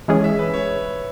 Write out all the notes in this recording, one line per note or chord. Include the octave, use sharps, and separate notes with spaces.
E3 G#3 C#4 G#4
E5
B4
C#5